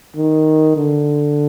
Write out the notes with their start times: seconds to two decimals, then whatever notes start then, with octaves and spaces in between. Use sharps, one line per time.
0.15 D#3
0.76 D3